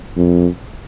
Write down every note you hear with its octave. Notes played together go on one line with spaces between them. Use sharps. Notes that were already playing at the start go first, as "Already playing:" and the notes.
F2